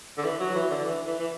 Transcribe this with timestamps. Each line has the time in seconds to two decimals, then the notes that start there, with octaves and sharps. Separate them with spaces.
0.18 D3
0.24 E3
0.40 F#3
0.56 E3
0.71 D3
0.85 E3
1.07 E3
1.19 E3